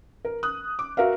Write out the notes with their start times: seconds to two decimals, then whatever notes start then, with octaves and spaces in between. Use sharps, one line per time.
0.25 A#4
0.43 D#6 F#6
0.79 D6
0.97 F#4 A#4 E5 F5